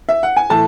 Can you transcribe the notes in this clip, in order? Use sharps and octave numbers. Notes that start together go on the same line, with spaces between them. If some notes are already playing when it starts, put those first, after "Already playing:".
E5
F#5
G#5
A2 E3 A3 A5